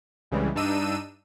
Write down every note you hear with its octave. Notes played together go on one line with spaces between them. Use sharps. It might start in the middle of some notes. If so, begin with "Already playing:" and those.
C2 C#3 E3 G3 G#3
G2 D4 D#4 E6 D#7